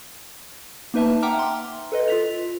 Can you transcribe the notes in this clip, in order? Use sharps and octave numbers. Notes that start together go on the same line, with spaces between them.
A#3 D#4 B4 E5 A5
E5 F#5 G5 A#5 D6 F6
C6
A4 B4 D#5
F4 B6 F7